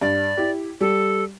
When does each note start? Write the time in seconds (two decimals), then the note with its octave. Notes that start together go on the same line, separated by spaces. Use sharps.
0.01 G2 D5
0.37 E4 G4
0.81 G3 A4